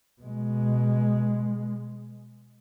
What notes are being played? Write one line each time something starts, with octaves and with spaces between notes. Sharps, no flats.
B2 G#3